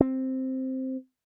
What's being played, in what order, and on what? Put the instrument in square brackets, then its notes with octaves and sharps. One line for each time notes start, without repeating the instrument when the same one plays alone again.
[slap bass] C4